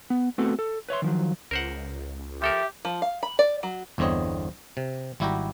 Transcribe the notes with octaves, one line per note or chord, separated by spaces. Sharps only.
B3
A3 B3 C4 F#4 A4
A4
B4 C#5 E5 C6
D#3 F3 F#3
C#2 A#4 C5 F#5
F3 G4 A4 A#4 E5
F3
F5
B5
D5
F#3
G1 E2 D3 C4 C#5 D#5
C3
G#1 G3 E4 F#4 G4 A#5